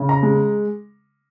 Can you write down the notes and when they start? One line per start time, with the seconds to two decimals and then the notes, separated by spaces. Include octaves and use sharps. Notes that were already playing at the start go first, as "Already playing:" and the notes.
Already playing: C#3
0.09 A#5
0.23 G#3